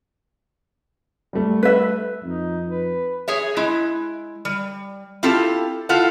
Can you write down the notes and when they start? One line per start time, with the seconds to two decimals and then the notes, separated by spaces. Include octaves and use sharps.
1.33 G3 A3
1.63 B4 E5
2.23 F2 D#4
2.68 B4
3.28 G#4 C#5 E5
3.57 G#3 E4
4.45 G3
5.23 C4 E4 F4 G4 A4
5.89 E4 F4 A4 F5 F#5